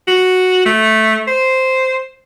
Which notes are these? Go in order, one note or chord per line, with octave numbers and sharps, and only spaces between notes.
F#4
A3
C5